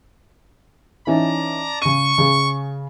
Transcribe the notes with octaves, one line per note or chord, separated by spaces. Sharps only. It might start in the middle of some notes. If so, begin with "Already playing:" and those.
E3 C#4 D#4 D5 A5 A#5
C#3 C#6 D#7
C#3 G#4